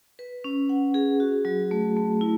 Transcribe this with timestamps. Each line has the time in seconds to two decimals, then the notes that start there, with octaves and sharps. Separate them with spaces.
0.19 B4
0.44 C#4
0.69 F#5
0.94 G#4
1.20 F#4
1.45 F#3
1.71 A3
1.97 A3
2.21 E4